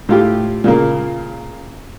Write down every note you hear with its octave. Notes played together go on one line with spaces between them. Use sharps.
A2 F4 G4
A#2 C#3 A#3